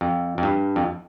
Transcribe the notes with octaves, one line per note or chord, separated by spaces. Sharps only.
F2
F2
G2
F2